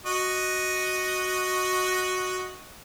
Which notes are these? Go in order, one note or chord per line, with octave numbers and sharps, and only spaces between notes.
F#4 D#5